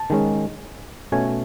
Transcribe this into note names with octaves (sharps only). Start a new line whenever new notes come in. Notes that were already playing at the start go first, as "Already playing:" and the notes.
Already playing: A5
D#3 G#3 C#4
B2 A3 C#4 G#5